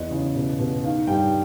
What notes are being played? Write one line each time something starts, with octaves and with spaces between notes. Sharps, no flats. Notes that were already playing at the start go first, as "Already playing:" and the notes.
Already playing: E2 D#5
C#3
B2
B2
D#3 F5
G2 G5